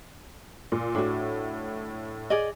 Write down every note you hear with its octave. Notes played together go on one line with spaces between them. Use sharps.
A#2
A2 D4 F#4
G#4 D5 D#5